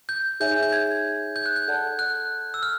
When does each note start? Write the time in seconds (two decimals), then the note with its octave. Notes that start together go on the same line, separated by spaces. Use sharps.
0.09 G6
0.40 D#4 G#4 C#5 E5 G#5 G6
0.63 G6
0.72 G#6
1.36 G6
1.46 F#6
1.56 G6
1.68 A4 D5 F#5 A5
1.99 F#6
2.54 E6
2.63 F6